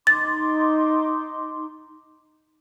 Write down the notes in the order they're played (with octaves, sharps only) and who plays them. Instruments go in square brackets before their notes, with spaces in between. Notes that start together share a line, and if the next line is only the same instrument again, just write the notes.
[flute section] D#4 C6 D6 [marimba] A6